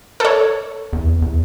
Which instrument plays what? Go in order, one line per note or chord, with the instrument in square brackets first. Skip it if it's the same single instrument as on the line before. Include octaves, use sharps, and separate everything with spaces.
[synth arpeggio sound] A4 C#5
[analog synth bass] E2
E2